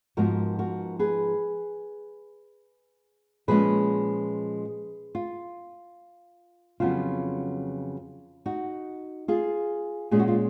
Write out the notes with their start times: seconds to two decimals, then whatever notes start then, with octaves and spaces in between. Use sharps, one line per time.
0.17 G#2 F3 B3 F#4 A#4
0.59 F#4 A#4
0.99 G#4 B4
3.48 A#2 F3 G#3 C#4 G#4 B4
5.15 F4
6.80 F2 C#3 F#3 B3 F4
8.46 D#4 F#4
9.28 F4 G#4
10.11 A#2 G#3 C#4 G#4
10.19 F#4
10.28 F4